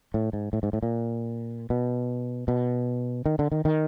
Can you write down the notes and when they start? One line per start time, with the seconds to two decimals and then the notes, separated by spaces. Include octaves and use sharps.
0.14 A2
0.33 G#2
0.53 A2
0.63 G#2
0.73 A2
0.83 A#2
1.70 B2
2.48 B2
3.26 D#3
3.39 D3
3.52 D#3
3.65 D#3